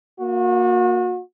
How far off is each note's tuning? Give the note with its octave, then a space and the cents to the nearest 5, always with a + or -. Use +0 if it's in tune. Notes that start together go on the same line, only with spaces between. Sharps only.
A#3 +0 F#4 -35